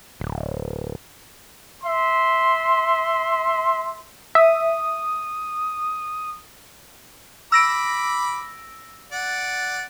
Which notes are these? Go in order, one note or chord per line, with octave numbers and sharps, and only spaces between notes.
D1
E5 C6
E5 D#6
B5 D6 E6 A#6 D7
D5 F#5